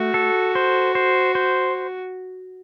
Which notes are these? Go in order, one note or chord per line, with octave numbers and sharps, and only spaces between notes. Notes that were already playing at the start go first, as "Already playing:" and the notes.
Already playing: A3 F#4
A4
C5
C5
C5